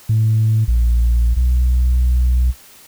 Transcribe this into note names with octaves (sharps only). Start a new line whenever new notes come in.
A2
A#1
B1